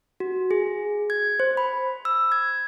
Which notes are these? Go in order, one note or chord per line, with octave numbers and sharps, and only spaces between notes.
F#4
G#4
G#6
C5
B5
E6
G#6